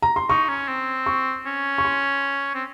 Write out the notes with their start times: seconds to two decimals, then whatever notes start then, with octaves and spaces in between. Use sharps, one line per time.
0.02 A#5
0.16 C6
0.29 D#4 C#6
0.49 C#4
0.68 C4
1.06 C#6
1.46 C#4
1.78 C#6
1.85 C6
2.55 C4